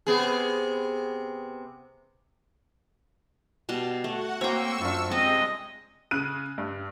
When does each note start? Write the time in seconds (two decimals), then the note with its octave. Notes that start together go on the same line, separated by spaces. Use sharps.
0.07 C3 B3 G#4
3.69 B2 G3 A5
4.04 A3 F#4 F#5
4.41 A#3 C4 C#5 G5 C#6 E6
4.81 F#2 D4 F4
5.11 C3 G#3 C4 D#5
6.11 C#3 F#6 D#7
6.58 G2